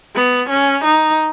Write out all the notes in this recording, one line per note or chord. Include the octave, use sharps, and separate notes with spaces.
B3
C#4
D#4